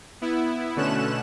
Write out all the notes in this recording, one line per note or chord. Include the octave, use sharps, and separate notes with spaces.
B3 E4
B2 D3 A3 C#4 F#6 E7